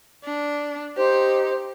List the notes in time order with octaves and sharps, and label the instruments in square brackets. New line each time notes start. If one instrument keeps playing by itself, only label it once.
[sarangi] D4
[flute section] D#4 C5 [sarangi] G4